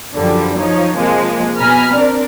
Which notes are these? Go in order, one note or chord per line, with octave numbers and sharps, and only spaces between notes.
F#2 D3 F3 G3
F3 D#4 C#5
C3 F3 G#3 A#3
B2 G#5 A#5 B5 F6
C4 D4 A#4 D5